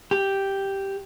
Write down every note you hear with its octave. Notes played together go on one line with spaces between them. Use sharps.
G4